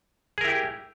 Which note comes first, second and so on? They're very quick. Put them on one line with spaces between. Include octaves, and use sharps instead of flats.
G#4 A#4 E4 G4